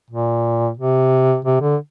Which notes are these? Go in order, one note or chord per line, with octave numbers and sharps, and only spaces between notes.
A#2
C3
C3
D3